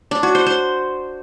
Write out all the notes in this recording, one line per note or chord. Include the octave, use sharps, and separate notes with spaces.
D4
F#4
C5
C5